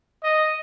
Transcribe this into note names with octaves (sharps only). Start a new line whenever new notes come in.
D#5